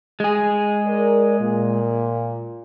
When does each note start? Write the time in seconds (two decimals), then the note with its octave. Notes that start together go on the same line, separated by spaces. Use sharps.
0.20 G#3 G#4
0.86 A#4 D5
1.40 A#2